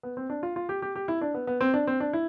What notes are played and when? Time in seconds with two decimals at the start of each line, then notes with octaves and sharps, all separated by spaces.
0.03 B3
0.17 C4
0.30 D4
0.43 F4
0.56 F4
0.69 G4
0.82 G4
0.96 G4
1.08 E4
1.21 D4
1.34 B3
1.47 B3
1.61 C4
1.74 D4
1.87 C4
2.00 D4
2.13 E4